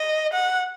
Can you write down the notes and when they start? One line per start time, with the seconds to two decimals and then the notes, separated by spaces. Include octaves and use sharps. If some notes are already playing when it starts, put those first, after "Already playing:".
Already playing: D#5
0.33 F#5